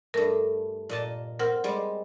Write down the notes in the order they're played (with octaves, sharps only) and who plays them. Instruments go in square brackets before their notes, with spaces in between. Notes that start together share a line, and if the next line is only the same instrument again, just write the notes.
[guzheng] G2 A3 [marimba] A#4
[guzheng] A#2 D#5 A5
[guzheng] C4 [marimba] A#4 F#5 F6
[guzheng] G3 G#3